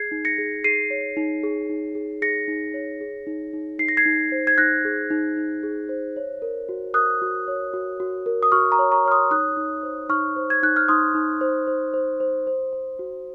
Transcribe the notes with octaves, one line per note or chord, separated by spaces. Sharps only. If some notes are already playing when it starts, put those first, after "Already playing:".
Already playing: G#4 G#6 C7
D#4
A#6 C#7
G#4
G#4 C7 D#7
C#5
D#4
G#4
D#4
G#4
G#4 A#6 C#7
D#4
C#5
G#4
D#4
D#4
D#4 C7
A#6
G#6 C7
D#4
C5
G#6
D#4 F#6 A#6
G#4
D#4
D#4
G#4
C5
C#5
A#4
F#4
A#4 D#6 F#6
F#4
C#5
F#4
F#4
A#4
D#6
F#4 C#6 F6
A#5 C#6
C#5
A#5 C#6
C#5 F6
C6 D#6
D#4 D#6 F#6
D#4
C5
D#4 C#6 F6
C5
G#6
D#4 F#6
F6
D#4 C6 D#6
D#4
C5
C5
C5
C5
C5
C5
F#4